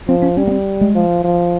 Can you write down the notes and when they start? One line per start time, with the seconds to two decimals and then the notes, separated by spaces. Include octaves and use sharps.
0.09 F3 C4
0.22 C#4
0.37 G3 C#4
0.47 A#3
0.51 C4
0.81 G#3
0.95 F3
1.24 F3